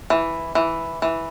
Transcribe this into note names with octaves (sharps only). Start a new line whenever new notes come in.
E3
E3
E3